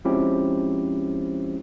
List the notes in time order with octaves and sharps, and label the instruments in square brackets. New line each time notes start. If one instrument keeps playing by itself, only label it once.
[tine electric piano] F3 G#3 C4 C#4 E4 G4